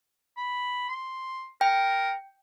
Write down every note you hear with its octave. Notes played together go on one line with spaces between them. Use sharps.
B5
C6
A#4 G5